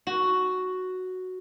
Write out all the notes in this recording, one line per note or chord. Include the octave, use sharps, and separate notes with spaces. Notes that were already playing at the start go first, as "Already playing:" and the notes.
F#4